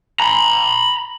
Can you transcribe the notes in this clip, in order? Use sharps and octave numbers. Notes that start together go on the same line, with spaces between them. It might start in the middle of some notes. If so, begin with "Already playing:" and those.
A#5 B5